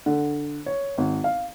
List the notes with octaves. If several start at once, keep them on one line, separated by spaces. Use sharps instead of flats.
D3
C#5
G#1
F5